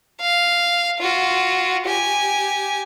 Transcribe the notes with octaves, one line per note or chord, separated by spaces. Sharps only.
F5
F4 F#4
G4 G#5